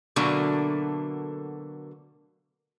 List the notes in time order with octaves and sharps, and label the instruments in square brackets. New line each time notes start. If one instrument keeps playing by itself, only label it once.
[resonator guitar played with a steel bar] B2 D3 F#3 A3 A#3